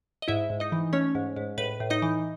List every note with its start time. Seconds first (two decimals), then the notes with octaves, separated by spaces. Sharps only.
0.22 D#5
0.28 G#2 E4 E5
0.50 G#2
0.60 D#4 D#5
0.72 E3
0.93 A3 C#4 C#5
1.15 G#2
1.36 G#2
1.58 A2 B4
1.80 A2
1.90 D#4 D#5
2.02 E3